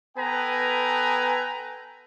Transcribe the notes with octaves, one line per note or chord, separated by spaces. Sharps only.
B3 A4 B4 G5 G#5 A#5